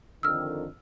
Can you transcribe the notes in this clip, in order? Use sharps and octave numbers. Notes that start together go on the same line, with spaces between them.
F2 D3 D#3 E6 F6